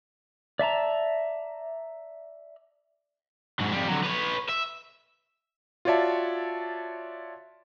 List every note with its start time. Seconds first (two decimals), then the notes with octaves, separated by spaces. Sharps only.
0.59 D5 E5 A5 A#5
3.60 G#2 F#3
3.72 F2 G3
3.89 D3 F#3
4.04 B4 C#5
4.49 E5
5.85 F4 F#4 C#5 D5 E5 A5